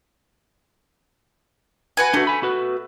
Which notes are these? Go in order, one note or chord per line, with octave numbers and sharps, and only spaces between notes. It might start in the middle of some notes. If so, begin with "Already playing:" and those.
F#4 B4 G#5
A3 D4 F#4
G#5 B5
F#4 B4